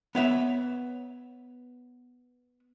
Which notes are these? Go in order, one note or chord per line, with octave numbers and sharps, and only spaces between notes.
B3 C#5 E5